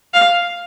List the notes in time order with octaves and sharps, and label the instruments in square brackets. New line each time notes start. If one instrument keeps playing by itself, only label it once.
[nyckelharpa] F5